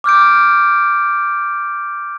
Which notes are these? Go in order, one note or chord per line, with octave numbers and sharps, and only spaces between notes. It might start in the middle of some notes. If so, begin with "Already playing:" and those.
D6 F6 G6 D7